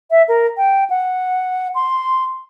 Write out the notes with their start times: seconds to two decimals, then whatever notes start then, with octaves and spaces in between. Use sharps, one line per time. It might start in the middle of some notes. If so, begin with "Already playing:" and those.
0.11 E5
0.28 A#4
0.57 G5
0.90 F#5
1.75 C6